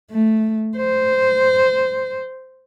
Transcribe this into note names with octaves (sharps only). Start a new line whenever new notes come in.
A3
C5